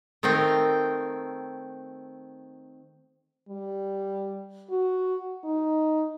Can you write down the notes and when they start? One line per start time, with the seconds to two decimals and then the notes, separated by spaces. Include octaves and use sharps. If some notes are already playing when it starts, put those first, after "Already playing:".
0.23 D#3 A3 C4 A#4 G5
3.48 G3
4.70 F#4
5.44 D#4